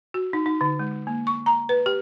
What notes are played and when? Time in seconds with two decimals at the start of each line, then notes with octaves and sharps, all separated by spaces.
0.14 F#4
0.33 D#4
0.46 D#4
0.61 D3
0.79 G#3
1.07 A#3
1.27 C#6
1.46 A#5
1.69 B4
1.86 G4